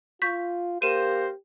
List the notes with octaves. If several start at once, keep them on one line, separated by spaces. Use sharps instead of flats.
F4 C#6 G6 B6
A#3 G4 A#4 C5 D#7 E7